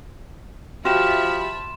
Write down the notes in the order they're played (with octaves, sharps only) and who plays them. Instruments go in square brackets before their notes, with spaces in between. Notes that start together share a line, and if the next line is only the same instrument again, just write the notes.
[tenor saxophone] F3 [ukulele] F#4 G4 [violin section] E5 A5 B5 [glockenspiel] C6 E7